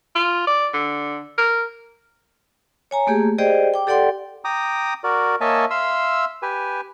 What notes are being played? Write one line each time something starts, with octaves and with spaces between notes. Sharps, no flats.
F4
D5
D3
A#4
C#5 G#5 A#5
A3 A#3 G4 G#4
G4 G#4 C5 D5 D#5 G5
G5 D6
G4 A4 D5 F#5 G5 C6
G5 A#5 D6 D#6
F#4 A#4 D5
A#3 C#5 D#5 E5 G#5 A5
E5 F5 C6 E6
G4 B4 G#5